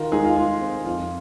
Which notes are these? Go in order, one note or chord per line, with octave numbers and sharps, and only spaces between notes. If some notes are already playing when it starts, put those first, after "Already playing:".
Already playing: D#3 F4 A#4
G#3 D#4 G#4
F4
G#3 F4
C4
F2 F4